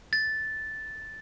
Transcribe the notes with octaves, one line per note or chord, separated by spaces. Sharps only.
A6